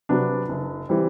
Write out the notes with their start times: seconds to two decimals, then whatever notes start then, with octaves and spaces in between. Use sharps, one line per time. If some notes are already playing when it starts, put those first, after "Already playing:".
0.09 C3 F#3 B3 D4
0.49 F#1
0.89 E3 G3 C4